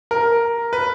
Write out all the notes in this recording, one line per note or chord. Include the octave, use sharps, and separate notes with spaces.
A#4
B4